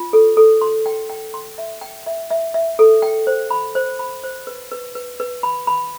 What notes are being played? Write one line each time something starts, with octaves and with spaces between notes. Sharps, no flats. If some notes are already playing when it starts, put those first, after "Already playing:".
Already playing: F4
A4
A4
C6
G5
G5
C6
E5
G5
E5
E5
E5
A4
G5
C5
B5
C5
B5
C5
B4
B4
B4
B4
B5
B5